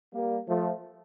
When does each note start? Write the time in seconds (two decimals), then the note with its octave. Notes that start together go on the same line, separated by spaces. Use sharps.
0.14 G3 A#3
0.48 F3 A3